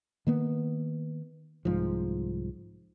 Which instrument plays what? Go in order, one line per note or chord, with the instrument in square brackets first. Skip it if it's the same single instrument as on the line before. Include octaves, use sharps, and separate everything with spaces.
[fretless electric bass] D#3 A#3 B3
C2 G#2 F3